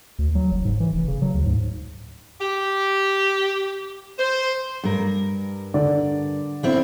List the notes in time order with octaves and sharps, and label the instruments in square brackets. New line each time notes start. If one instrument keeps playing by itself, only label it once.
[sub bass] D2
F#3
F#1
G#2
E3
F1
C#3
F#3
D2
G#2
[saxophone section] G4
C5
[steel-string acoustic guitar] G2 A#4
[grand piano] D3 D5
[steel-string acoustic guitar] B3 C4 E4